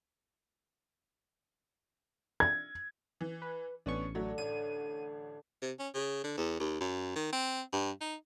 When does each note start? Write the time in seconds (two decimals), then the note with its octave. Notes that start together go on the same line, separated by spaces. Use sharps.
2.40 G#6
3.21 E3
3.42 B4
3.86 A1 B3 C#4 D4 C#6
4.15 D3 F#3 A3
4.38 A1 D#7
5.62 C3
5.79 C#4
5.94 C#3
6.24 D3
6.37 E2
6.60 D#2
6.80 F#2
7.16 D#3
7.33 C4
7.73 G2
8.01 D#4